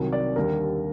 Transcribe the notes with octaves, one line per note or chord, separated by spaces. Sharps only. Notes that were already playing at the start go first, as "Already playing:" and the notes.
Already playing: C2 C3 D#3 F#3
D5
D#2 D3 G3 A#4